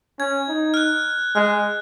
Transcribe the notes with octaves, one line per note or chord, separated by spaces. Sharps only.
C#4 G#6
D#4
F6
F#6
G#3 F6